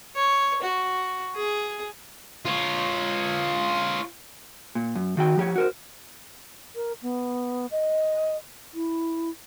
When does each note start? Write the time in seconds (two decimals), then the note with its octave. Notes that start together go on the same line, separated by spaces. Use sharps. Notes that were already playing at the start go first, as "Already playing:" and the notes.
0.15 C#5
0.62 F#4
1.35 G#4
2.45 F4 C#5
4.75 A#2
4.95 F#2
5.17 D#3 F#4 G5
5.37 F3 G4 C#5
5.56 F#4 A#4 C5
6.75 A#4
7.03 B3
7.71 D#5
8.74 E4